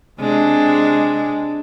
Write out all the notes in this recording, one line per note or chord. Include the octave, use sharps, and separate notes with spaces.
C3 G#3 D4